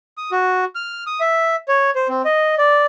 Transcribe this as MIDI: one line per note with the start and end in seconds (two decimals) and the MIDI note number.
0.17 0.31 87
0.32 0.65 66
0.75 1.04 89
1.07 1.20 87
1.20 1.56 76
1.68 1.90 73
1.95 2.08 72
2.09 2.22 60
2.25 2.55 75
2.58 2.86 74